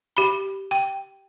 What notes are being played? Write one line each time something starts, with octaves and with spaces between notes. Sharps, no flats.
G4 B5
G5